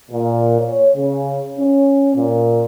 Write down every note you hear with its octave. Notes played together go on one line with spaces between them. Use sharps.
A#2
C#5
C#3
C#4
A#2